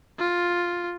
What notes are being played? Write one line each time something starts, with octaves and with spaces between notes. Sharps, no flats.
F4